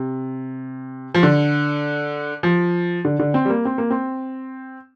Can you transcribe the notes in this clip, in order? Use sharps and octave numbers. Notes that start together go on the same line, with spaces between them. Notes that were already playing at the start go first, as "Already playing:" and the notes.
Already playing: C3
F3
D3
F3
D3
D3
C4
G3
A#3
C4
A#3
C4